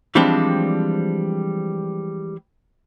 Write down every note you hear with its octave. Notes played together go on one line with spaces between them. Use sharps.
E3 F3 G3 G#3 C4 D4